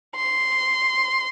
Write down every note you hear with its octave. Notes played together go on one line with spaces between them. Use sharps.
C6